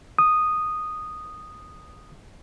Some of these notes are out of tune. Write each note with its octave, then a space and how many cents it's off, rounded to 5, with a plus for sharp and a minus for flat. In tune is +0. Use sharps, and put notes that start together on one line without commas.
D#6 -10